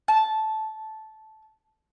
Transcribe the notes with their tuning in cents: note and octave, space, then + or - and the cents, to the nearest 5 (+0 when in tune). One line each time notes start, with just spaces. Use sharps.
A5 -10